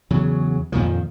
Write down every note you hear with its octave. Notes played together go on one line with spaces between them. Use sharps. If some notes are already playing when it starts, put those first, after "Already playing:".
E2 C#3 F#3
F2 A#2 D#3 F3